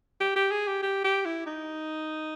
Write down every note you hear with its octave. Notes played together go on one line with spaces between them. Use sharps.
G4
G4
G#4
G4
G4
G4
E4
D#4